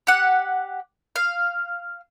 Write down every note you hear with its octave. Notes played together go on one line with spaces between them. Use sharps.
G4 F#5
F5